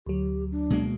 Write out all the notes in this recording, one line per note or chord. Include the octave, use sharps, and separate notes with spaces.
D2 F#3 G4
D4
B2 G#3 A#3